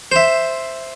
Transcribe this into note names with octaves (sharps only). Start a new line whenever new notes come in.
C5 E5